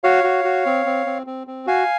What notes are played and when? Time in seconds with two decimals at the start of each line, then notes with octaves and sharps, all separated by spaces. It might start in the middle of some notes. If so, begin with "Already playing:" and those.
0.04 F#4 C#5 F5
0.24 F#4
0.45 F#4
0.66 C4
0.86 C4
1.06 C4
1.27 C4
1.47 C4
1.67 F#4 F5 G#5